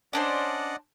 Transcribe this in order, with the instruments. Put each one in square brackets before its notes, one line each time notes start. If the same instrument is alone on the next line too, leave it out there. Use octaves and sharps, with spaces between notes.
[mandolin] C#4 D4 C5 [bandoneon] D5 D#5 F#5